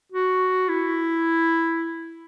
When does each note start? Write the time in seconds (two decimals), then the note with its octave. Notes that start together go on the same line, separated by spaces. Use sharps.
0.12 F#4
0.69 E4